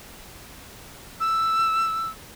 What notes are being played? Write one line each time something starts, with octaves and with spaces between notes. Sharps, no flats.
E6